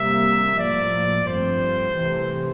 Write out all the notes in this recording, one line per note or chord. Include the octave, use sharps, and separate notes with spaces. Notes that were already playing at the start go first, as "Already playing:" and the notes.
Already playing: C3 G3 A#3 E5
A2 F3 A#3 D5
G2 F3 A3 C4 C5
C3 E3 A3 C4